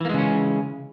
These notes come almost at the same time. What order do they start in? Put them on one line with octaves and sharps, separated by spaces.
E3 A#3 G#3 C#3 C#4